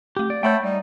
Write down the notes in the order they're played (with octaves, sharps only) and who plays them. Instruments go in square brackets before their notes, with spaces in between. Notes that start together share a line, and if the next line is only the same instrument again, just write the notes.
[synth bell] A3 D6 [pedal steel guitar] G4
[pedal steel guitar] D5
[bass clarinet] A3 [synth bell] C#5 F#5 [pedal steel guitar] G5 B5 G6
[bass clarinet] G3 [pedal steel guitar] D#4